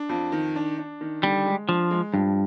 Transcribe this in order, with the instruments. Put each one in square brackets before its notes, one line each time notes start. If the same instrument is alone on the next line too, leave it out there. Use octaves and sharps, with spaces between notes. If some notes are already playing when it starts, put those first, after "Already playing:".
Already playing: [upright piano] D4
F2
D#3
D4
D4
D#3
[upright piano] D3 [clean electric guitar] G3
[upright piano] G#3
[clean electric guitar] F3 [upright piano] D4
[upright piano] G#3
[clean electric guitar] G2 [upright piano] F3